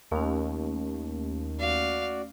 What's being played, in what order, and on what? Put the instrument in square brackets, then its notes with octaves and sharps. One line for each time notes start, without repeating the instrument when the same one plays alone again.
[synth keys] D#2 [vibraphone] A3 C#4
[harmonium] F#4 D5 [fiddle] F5